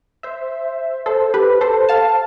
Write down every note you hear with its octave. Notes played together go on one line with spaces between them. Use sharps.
C5 E5
A4 C5
G4 B4
A4 C5
F5 A5